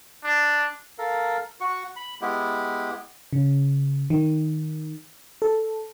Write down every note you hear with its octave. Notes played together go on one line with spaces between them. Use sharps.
D4
A4 A#4 F5
F#4 C#6
B5
G#3 B3 E4 G4
C#3
D#3
A4